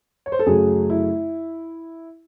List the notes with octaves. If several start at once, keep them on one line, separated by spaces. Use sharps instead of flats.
C#5
C5
A4
F#2 C#3 F#3 A3 G#4
E4